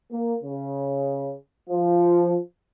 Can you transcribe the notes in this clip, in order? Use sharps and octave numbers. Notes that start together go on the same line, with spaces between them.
A#3
C#3
F3